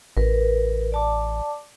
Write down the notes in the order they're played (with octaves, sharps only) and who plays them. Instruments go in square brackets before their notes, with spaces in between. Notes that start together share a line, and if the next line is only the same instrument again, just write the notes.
[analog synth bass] A1 [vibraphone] A#4 B4
[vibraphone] D5 A5 D6